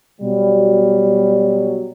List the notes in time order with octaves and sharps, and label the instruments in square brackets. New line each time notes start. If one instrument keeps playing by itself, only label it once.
[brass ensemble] B2 F#3 G3